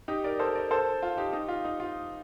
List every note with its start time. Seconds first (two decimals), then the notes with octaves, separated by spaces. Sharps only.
0.08 D#4 G4
0.24 A#4 D5
0.39 A4 C5
0.55 A#4 D5
0.71 A4 C5
1.03 F4
1.17 D#4 G4
1.33 D#4 G4
1.48 F4
1.65 D#4
1.80 F4